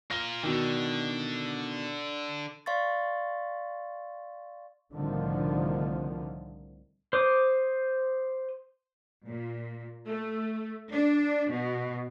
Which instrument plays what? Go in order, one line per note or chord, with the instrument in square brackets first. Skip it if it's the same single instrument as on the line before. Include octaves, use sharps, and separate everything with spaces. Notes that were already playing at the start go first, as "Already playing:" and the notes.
[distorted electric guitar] F4 A#4 [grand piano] A#6 G7
[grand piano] B2 D#3 [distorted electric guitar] D3
[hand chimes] D5 F5 C6 C#6 A6
[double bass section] C2 A2 D3 D#3 F3
[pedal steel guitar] C5 D6 D#6
[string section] A#2
A3
D4
B2